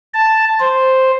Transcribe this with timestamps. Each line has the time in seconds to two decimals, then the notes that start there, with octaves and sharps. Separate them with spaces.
0.14 A5
0.60 C5